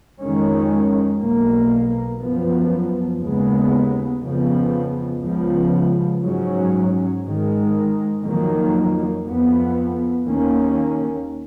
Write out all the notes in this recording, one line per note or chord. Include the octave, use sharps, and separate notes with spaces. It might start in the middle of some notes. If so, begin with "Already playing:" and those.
F2 D#3 G#3 C#4
B1 B2 A#3
F#2 F3 B3
D#2 C#3 G#3 B3
F2 C#3 F3 B3
C#2 C#3 F3 B3
G#2 F#3 C#4
G#2 D#3 G#3
F2 D#3 F#3 A#3
F2 F3 B3
D#2 D#3 A#3 C#4